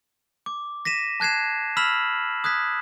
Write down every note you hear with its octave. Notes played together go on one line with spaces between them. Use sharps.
D6
A#6 B6 D#7 E7
A5 F#6 G#6 C7 E7
B5 E6 F6 B6 E7 F#7
D#6 F#6 G#6 B6